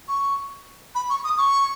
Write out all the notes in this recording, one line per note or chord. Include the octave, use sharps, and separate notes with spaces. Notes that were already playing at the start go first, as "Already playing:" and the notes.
C#6
B5
C#6
D#6
C#6